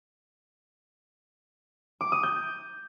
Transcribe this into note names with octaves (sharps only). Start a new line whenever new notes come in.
D6
D#6
G6